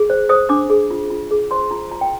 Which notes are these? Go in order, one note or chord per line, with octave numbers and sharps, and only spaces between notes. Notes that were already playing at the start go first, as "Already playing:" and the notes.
Already playing: G#4
C5
C5 D#6
D4 D6
G#4
F4
F4
G#4
C5 C6
F4 A#5
F4 A#5
G5